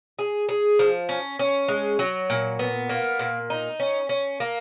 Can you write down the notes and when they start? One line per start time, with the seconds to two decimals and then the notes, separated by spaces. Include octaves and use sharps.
0.19 G#4
0.49 G#4
0.79 F3
1.09 C#4
1.39 C#4
1.68 G#3
1.99 F#3
2.30 A#2
2.59 B3
2.89 A#3
3.19 A#2
3.50 D#4
3.80 C#4
4.09 C#4
4.40 A#3